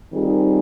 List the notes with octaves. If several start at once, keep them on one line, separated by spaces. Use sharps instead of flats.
D#3 G3 C4 F4 G#4